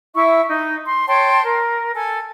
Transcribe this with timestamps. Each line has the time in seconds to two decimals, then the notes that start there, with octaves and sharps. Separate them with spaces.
0.15 E4 E5 C#6
0.48 D#4
0.85 C6
1.08 C#5 G5 A5 C6
1.44 A#4
1.95 A4 G#5